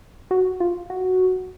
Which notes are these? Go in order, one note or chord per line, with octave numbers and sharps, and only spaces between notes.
F#4
F4
F#4